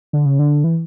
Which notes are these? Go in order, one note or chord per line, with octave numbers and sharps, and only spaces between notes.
D3
C#3
D3
E3